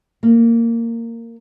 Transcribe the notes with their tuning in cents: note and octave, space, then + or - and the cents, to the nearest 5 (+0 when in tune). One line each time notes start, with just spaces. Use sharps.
A#3 -15